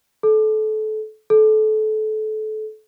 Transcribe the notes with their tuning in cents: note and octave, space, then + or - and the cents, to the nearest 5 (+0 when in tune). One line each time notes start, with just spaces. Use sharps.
A4 -25
A4 -25